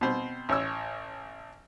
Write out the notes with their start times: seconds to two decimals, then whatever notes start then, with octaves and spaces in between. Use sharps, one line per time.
0.01 B2 C4
0.49 A1 C#5 E6